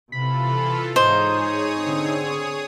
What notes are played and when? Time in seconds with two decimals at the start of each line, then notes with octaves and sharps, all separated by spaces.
0.12 C3 E3 F4 A4 B5
0.96 G#2 D#4 G#4 C5 C#5 D#6
1.80 D3 C4